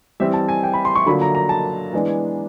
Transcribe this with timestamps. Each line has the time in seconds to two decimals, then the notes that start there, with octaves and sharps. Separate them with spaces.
0.20 E3 G3 C4 E5
0.34 A5
0.49 G#5
0.63 G5
0.74 B5
0.85 C6
0.95 C#6
1.06 D3 F#3 A#3 D4 F4 B5
1.21 A#5
1.35 A#5
1.49 A5
1.93 E3 G#3 B3 D4